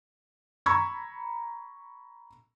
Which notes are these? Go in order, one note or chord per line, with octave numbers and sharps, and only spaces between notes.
A#5 B5 C#6 E6 G#6